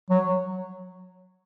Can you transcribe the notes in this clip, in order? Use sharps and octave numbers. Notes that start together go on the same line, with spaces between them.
F#3